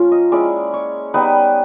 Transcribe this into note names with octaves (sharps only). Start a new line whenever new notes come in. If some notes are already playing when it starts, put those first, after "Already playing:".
Already playing: F3 A#3 C#4 F4
D#5
G#3 C#4 E4 D5
C#5
G3 B3 D#4 B4